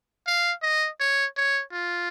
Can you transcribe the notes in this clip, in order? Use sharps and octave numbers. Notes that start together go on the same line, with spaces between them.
F5
D#5
C#5
C#5
F4